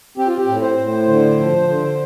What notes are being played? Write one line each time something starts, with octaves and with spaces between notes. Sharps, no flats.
C4 G4
F4
G4
A2
C5
A2
D3
F3
D3